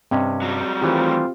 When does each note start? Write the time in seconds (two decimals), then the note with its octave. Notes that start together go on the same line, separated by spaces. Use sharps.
0.11 G2 C3 C4 C#4 D#5
0.42 F#3 G3
0.82 D#3 E3 A3 C4 F4 G4